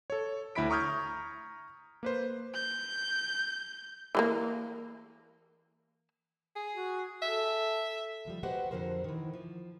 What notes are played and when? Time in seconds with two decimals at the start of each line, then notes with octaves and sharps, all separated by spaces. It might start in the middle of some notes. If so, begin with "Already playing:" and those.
0.10 A4 C#5
0.55 D2 E4 E5 B5 B6 D7
0.70 A#5 C#6 D#6 F6 G6 G#6
2.03 A#3 B4 C5
2.54 G6
4.15 E3 G#3 A#3
6.56 G#4
6.74 F#4
7.22 A4 E5
8.25 D#2 F3 G3
8.43 F#4 G4 B4 C5 D#5 F#5
8.71 F2 D3 F3 A#4 C5
9.04 D#3 E3
9.34 F3